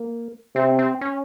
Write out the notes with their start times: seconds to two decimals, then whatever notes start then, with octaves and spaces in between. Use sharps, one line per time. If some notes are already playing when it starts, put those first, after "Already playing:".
Already playing: A#3
0.55 C3 C4
0.79 C4
1.01 C#4